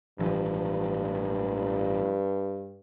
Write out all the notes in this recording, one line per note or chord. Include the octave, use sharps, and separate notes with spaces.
A1 G2 E3 F3